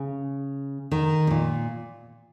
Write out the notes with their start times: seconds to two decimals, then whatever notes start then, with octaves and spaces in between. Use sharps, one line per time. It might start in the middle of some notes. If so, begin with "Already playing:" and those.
Already playing: C#3
0.91 D#3
1.27 C3
1.31 A#2